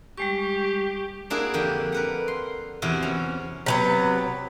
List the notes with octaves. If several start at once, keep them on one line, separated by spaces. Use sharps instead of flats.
G3 G#3 G4 C#6
A#3 D4 E4 F#4 G#4
F2 D3 D4 G4
A#4 B4 F#5
C6
E2 C3 E4 F#4
C#4
C3 F#3 B3